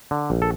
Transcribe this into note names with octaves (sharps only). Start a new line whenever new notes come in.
D3
A#1
A4